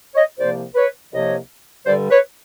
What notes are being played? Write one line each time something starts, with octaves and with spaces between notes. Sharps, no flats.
C#5 D#5
C2 C3 F3 A#3 C5 D5
B4 C#5
C2 C3 F3 A#3 C#5 D#5
G2 D3 G3 C5 D5
B4 C#5